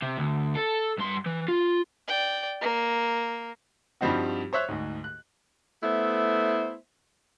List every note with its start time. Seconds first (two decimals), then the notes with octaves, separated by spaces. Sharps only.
0.03 C3
0.18 D2
0.56 A4
0.99 G2 C6
1.26 E3
1.48 F4
2.08 D5 G5
2.61 A#3
4.01 G2 F3 G3 C4 D#4 F#4
4.53 C5 C#5 E5 F#6
4.68 D2 G#2
5.04 F#6
5.83 A3 B3 E4 C5 E5